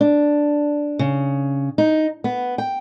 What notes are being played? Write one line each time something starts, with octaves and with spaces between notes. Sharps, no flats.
D4
C#3
D#4
B3
G5